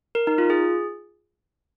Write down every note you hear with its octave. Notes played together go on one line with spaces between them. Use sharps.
A#4
D#4
F4
G#4